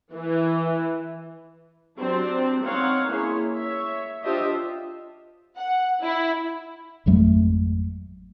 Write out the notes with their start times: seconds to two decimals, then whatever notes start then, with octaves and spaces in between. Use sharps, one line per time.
0.13 E3
1.98 F#3 C4 D4 G4 C5 D5
2.63 C4 D#4 C#5 F5 F#5 C6
3.09 A#3 C#4 E4 G#4 C#5 C6
3.57 C#5 E5
4.23 D4 F4 G4 C5 D#5 E5
5.56 F#5
6.02 E4
7.06 G#1 F2 F#3 A3